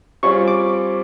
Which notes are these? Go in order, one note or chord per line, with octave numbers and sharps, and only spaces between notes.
G3 C4 F4 G#4 C#5 C#6
D6